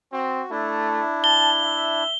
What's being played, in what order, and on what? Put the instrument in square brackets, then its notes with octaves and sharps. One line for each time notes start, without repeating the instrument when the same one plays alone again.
[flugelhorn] C4 [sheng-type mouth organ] F#4
[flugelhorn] A3 [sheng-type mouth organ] D4 E4
[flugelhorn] A5 [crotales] G7
[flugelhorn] E5